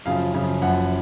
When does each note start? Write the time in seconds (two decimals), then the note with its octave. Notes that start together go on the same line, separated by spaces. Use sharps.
0.05 F#2 C#3 F3 F5
0.33 F#2 C#3 F3
0.62 F#1 F#2 F3 F#5